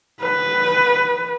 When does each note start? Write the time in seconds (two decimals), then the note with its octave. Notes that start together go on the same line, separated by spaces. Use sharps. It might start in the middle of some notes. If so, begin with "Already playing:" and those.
0.21 B4